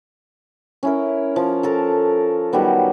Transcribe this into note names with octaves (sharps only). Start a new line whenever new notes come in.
C#4 E4 A#4
F3
A4 A#4 A5
D#3 F#3 G3 B3